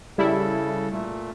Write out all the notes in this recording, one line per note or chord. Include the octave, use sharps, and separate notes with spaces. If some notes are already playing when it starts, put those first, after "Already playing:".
C#3 G3 E4 A4
A#2 A3